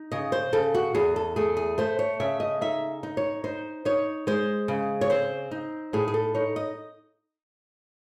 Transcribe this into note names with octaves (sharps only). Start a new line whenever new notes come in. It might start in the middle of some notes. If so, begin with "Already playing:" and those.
Already playing: D#4
C#3 D#5
C5
C#3 A4
F#4
E2 G#4
A4
A3 G#4
G#4
A3 C5
C#5
C#3 E5
D#5
D#4 E5
D#4
C#5
D#4 C5
D#4 C#5
G#3 C5
C#3
C#5
C4 C5
D#4
A2 G#4
G#4
A4
D#4 C#5
D#5